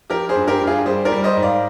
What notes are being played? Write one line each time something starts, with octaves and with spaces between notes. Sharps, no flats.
F3 G4 A#4
G#4 C5
G2
G4 A#4
G2
F4 G#4
G3 G#4 C5
A#4 D5
G3
C5 D#5
G#2
D5 F5